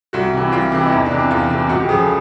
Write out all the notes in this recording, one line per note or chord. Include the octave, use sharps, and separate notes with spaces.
C2 F#4
C3 E3
C2 F4
C3 E3
E4
E2 D#4
D4
C3 E3
D4
E2 F4
C3 E3
C#2 F#4
G4
C#3 F3 G#4
A4